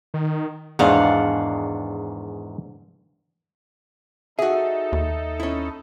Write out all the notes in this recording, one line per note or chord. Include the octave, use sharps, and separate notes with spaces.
D#3
E2 G#2 D#3 D4 F5 F#5
D#4 F#4 G#4 A4 E5
D#2
C#4 E4